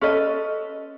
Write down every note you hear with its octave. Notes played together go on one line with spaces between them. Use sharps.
C#4 A4 B4 D#5